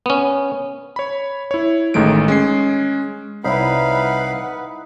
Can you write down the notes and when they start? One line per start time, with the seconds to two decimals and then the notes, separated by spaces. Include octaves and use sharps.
0.06 B3 C#4
0.96 C#5 B5
1.51 E4 C#5
1.94 A1 D#3 G#3 A3 D7
2.28 G#3 C#4 C7
3.44 C2 D#4 E4 B4 C#5 F5 F#5 B5